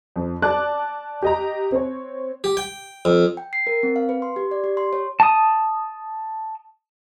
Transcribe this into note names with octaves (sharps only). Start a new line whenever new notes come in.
F2
D5 A5 D6 F#6
G4 D#5 A#5
C4 C#5
G4
G5
F2
G5
C7
A#4
C4
F5
B4
C6
G4
D5
G4
C6
C#5
A5 D#6